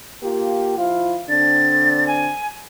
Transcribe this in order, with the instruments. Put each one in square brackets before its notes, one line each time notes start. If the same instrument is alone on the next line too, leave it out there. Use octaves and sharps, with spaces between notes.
[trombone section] A#3 F4 G4
F3 E4 F4
[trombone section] D3 C4 D4 [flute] A6
[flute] G#5